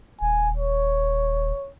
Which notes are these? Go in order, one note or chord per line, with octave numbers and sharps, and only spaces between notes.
D#1 G#5
C#5